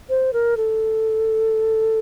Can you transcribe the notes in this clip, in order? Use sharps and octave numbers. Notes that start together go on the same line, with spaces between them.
C5
A#4
A4